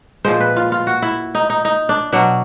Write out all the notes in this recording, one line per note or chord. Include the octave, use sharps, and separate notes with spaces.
A#2 F3 G#3 C5
B4
F4
F4
F#4
E4
D#4
D#4
D#4
D4
B2 F#3 D4